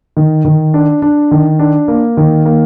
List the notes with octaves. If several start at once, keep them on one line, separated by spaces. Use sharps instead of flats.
D#3
D#3
D4
D4
D#3
D4
A#3
D#3
A#3